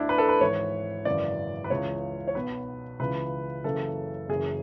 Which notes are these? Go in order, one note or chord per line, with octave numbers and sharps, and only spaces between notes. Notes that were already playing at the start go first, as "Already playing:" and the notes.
Already playing: D2 D3 D4 E4
B4
A4
B4
G#1 G#2 E3 C#5
G#1 F#2 C#3 E3 D5
B4
C#2 C#3 E3 C#5
C#5
B1 B2 B4
C#2 C#3 E3 B4
F#1 F#2 C#3 E3 A4
F#1 F#2 E3 G#4